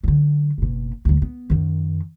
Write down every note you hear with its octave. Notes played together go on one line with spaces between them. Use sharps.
D3 F#3
F#1 B2
D2 F#3
B3
F#2 D#3